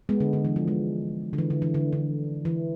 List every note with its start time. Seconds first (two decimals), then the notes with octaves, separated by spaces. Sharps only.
0.09 G#3 B3
0.20 D3
0.33 D3
0.45 E3
0.56 F3
0.68 G#3
1.33 D3
1.38 E3
1.50 D3
1.62 E3
1.74 D3
1.93 D3
2.45 E3